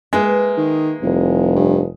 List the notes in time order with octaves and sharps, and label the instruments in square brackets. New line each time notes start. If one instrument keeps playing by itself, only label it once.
[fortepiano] G#3 [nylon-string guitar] A#3 B4 E5
[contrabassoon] D#3
[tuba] F1 [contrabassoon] C2
[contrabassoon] G2